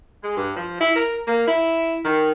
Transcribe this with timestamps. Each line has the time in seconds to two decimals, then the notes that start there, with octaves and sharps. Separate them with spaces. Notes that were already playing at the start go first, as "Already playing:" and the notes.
0.23 G#3
0.37 G2
0.56 F3
0.81 E4
0.96 A#4
1.28 A#3
1.47 E4
2.04 D#3